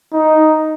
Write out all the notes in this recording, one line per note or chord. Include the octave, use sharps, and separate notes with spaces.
D#4